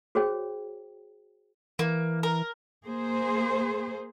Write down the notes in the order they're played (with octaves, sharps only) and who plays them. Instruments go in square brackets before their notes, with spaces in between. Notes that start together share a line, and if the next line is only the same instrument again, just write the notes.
[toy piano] F#4 G#4 C5 C#5 G5
[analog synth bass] E3 [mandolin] A#3
[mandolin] A#4
[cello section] A#3 G#4 C5